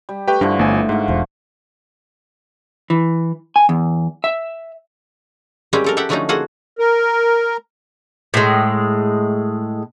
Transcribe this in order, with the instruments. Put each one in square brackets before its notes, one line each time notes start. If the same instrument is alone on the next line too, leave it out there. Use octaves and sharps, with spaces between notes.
[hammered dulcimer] G3
[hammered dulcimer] A3 [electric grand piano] G4 B4 G5
[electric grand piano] G2 [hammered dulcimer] D3 E3 F3 [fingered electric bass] D4
[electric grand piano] G1 G#5 [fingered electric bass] A3
[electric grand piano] G#2 [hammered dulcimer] F5 F#5
[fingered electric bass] E1 E2 [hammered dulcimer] F3
[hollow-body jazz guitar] E3
G#5
E2
E5
[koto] G3 G#3 A#3 C4 C#4 G4
F3 A4 A#4
G4 A4 E5 F#5
D3 F3 F#3 A3 C#4 D#4
A#3 F4 F#4 G#4 A4 F#5
[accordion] A#4
[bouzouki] A2 G#3